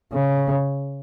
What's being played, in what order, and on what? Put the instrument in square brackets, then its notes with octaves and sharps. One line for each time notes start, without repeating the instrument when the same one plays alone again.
[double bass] C#3